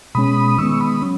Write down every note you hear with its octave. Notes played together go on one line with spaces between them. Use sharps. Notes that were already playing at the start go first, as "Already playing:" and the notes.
B2 G#3 C#4 B5 D#6
D#3 G#3 B3 C#6 E6
B5 D#6
F#3 C#4